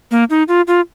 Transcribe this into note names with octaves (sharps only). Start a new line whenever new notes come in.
A#3
D#4
F4
F4